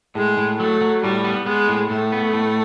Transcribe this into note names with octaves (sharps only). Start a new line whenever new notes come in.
A2 G#3
A2
F#3 A3
F#3
A2 G3
B3
G#3 B3
A2
A2 A3
B3
A2